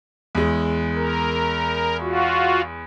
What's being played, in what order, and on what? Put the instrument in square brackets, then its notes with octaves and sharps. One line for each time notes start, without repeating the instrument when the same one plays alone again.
[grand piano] E2 G#3
[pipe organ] A#4
F4 F#4